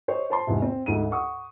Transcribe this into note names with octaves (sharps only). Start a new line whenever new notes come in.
C5 C#5 D#5
C5 A5 C6
E2 G#2 C3
C4
D2 G#2 D#4 D#7
F#5 C#6 D#6